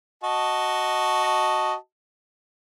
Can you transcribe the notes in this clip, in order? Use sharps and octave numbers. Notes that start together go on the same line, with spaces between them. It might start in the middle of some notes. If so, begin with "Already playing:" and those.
F#4 D#5 A5